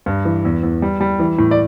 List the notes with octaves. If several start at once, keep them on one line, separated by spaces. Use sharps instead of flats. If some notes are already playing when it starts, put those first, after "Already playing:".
G2
E3
E2
E2
G3
G3
E3
A2
D5